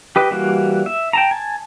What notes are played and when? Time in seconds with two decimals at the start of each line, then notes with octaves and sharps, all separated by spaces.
0.16 G4 B4 D#5
0.31 E3 G3 A#3 F#4
0.86 E5
1.13 G5 A5 A#5
1.31 G#5 A5